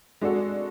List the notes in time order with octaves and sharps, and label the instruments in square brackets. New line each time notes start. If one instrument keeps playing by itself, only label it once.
[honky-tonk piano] G#3 D4 F#4 A4